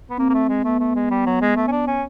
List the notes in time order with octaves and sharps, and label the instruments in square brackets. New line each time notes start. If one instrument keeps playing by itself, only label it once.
[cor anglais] B3
[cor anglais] A#3 [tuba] C4
[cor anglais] A#3
A3
G#3
[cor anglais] A3 [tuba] B3
[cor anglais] A3
G#3
G3
F#3
G#3
A3
C#4
D4
C#4